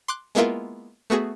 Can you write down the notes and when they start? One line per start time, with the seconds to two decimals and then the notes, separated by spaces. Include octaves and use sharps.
0.08 C6 D6 F#6
0.35 G#3 A#3 B3 E4 F4 A#4
1.10 A3 B3 F#4 G#4